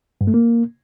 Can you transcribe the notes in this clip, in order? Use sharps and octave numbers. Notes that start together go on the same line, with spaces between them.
G2
A3
A#3